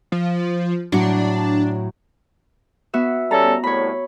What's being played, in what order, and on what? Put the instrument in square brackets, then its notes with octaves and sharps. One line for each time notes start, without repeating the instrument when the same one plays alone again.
[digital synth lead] F3
[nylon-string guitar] A2 F#3 F#4 [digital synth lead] D4
[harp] B3 F#4 E5
[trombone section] G3 C#4 A4 [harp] A#5
[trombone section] C2 A2 [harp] C#5 B5